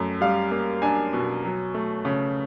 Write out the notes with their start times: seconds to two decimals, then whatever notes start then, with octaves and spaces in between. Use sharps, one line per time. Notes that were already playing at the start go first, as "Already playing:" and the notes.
Already playing: F#2 A3
0.21 G3 F5
0.51 A#3
0.82 D4 G#5
1.13 B2
1.44 F#3
1.74 A3
2.05 C#3